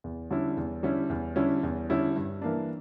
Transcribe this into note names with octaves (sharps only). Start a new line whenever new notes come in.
E2
D3 G3 C#4 E4
E2
D3 G3 C#4 E4
E2
D3 G3 C#4 E4
E2
D3 G3 C#4 E4
G2
E3 A#3 D4